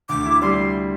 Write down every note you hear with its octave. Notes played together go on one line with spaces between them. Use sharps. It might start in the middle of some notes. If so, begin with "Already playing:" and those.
D2 D6
E4
G3 C6